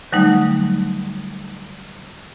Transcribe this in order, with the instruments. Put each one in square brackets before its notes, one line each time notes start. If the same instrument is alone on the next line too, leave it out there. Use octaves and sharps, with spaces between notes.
[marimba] D3 F#3 G3 A3 D#4